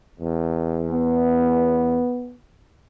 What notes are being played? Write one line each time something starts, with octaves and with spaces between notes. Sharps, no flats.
E2
B3